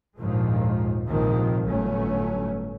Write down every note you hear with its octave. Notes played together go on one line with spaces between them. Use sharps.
A#1 D#2 G#2 D#3 F3 G#3
A#1 D#2 G#2 C3 D#3 F3
G1 A2 F#3 A3 C#4